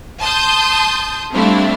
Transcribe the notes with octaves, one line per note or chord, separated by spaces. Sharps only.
A5 C6 D#6 G6
G3 A3 C4 D4 E4 F5